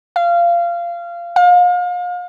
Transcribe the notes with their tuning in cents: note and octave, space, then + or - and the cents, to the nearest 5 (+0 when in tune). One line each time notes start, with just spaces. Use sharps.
F5 -20
F5 +35